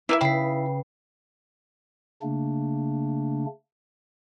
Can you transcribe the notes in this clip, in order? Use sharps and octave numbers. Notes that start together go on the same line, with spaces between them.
A#3 D#4 E4 B4 E5
C#3 E5 G5 B5 C7
C#3 A3 A#3 D4